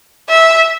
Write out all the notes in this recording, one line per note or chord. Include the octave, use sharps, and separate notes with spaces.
E5